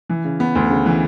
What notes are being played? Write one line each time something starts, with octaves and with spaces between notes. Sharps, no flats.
E3
C#3
B3
D2
C#3
E3